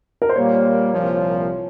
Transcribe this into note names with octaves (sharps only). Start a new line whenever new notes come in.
A#4
C5
A#2 G3 A#3 C#5
C2 A#2 F3 C#5